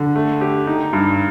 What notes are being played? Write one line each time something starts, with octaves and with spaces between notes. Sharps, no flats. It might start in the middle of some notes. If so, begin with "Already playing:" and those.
Already playing: D3
A3
G4
D#4
G2